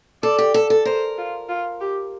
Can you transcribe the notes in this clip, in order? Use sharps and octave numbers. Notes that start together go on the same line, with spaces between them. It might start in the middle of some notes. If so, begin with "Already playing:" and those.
A4 D5
G4
A4
A4
A#4 C5
F4
F4
G4